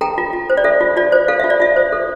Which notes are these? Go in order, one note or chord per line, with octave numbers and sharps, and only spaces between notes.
A4 G5 A#5
F4
F4
C5
D5
A4 E5
F4
F4 D5
C5
A4 F5
F4 E5
D5
F4 E5
C5
A4